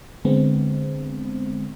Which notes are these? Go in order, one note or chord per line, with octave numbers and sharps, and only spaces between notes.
D3 G#3 B3 C4